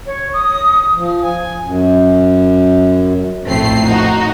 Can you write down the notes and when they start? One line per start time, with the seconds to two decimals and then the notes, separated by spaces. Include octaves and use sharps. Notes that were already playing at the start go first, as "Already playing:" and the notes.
0.06 C#5
0.33 D#6
0.94 F3
1.23 G#5
1.61 F#2
3.46 A#1 F2 A2 A3 C4 C7
3.86 D#4 F#4